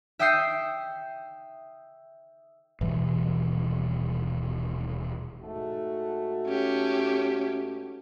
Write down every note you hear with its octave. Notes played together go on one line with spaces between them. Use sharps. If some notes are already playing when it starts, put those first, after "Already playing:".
E5 G5 D#6 G6 C7 C#7
D#1 B2 E3 G3
G#2 A3 F#4
C#4 G4